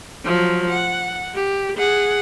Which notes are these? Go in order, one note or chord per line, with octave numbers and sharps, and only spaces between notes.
F3 F#3
F#5
G4
G#4 F#5